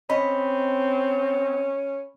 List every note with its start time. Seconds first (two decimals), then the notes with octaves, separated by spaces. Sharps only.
0.10 C4 C#4 D#5 B5